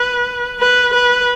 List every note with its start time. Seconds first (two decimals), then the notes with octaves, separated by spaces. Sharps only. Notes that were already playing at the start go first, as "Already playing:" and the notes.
Already playing: B4
0.60 B4
0.94 B4